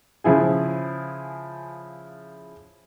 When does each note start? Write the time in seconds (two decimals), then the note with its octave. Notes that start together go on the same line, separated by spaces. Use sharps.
0.24 C#3 F3 E4 G#4